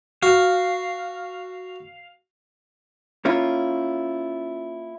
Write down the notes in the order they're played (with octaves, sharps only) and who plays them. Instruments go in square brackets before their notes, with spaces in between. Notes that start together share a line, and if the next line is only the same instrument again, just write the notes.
[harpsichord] F#4 [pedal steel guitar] F5
[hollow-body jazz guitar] A#3 C#4 E4 F4